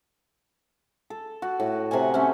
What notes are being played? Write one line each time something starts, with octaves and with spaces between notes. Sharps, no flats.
A4
F#4
A2
C3 A3 F#5 G#5
A3 C4 C#4